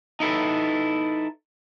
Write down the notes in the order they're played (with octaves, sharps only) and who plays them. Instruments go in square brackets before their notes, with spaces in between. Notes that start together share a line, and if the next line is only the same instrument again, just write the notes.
[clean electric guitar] D#4 E4 A4 B4